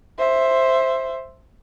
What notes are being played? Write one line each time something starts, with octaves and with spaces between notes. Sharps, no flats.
C5 E5